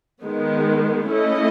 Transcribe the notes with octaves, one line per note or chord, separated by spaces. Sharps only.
D#3 G#3 B3
A3 C#4 E4 A4 D#5